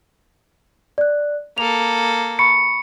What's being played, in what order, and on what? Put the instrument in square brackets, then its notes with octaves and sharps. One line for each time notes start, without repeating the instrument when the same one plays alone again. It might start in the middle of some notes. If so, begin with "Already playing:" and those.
[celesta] D5 F#6
[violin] A#3 A4 [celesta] F7
[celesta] B5 C#6 [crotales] C#7